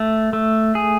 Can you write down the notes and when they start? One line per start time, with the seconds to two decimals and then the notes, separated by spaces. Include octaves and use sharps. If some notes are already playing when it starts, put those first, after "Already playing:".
Already playing: A3
0.33 A3
0.75 G#4